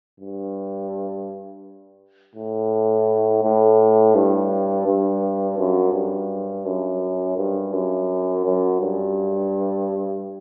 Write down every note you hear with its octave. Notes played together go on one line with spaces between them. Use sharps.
G2
A2
A2
G2
G2
F#2
G2
F#2
G2
F#2
F#2
G2